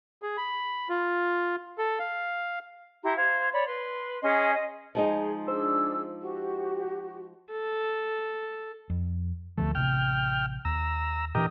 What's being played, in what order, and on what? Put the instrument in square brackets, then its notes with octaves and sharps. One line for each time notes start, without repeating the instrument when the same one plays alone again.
[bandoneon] G#4
B5
F4
A4
F5
[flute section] E4 G4 A#5 C6
C5 F5 G#6
C#5 D5 B5
B4 C6
C#4 G#4 D#5 C6
D#5
[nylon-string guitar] F3 G#3 D#4 [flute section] G#4
[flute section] D4 G#4 E6 [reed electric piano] C5
[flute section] F#4 G4
[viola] A4
[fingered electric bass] F2
[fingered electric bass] D2 D3 F3 [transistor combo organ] A3
[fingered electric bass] A1 C3 [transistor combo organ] G5 F6
[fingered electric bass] D#2 [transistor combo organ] A#5 E6
[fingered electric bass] A#2 E3 D4 [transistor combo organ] G4 A#4 D#5